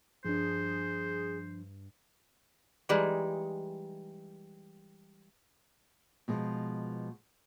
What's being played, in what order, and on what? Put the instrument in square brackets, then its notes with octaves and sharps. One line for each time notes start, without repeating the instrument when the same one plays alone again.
[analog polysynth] G2 [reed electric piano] F3 D4 [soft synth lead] G#4 [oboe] C5
[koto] E3 G3 G#3 D#4
[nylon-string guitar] B2 F3 G#3